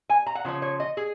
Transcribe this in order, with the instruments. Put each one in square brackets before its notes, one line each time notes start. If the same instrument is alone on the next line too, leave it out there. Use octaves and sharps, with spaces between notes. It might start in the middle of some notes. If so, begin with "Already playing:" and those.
[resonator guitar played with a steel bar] G#5
A#5
F#5
C#3 F3 C#4
C#5
D#5
G#4